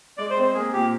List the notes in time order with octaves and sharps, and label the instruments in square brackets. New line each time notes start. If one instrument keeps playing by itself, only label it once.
[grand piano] G#3 [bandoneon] D5
[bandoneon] C5
[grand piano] C4
[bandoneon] C5
[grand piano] A#3 [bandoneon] G#4
[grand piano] A#2 [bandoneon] G4